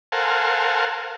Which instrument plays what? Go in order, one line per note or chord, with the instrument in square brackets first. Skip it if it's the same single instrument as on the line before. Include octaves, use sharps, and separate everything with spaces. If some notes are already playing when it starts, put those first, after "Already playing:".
[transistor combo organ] A4 A#4 C5 F5 F#5 G#5